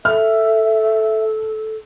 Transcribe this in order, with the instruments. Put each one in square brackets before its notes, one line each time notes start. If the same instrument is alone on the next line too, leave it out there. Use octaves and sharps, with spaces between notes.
[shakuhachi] A4 [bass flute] E5 [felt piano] F6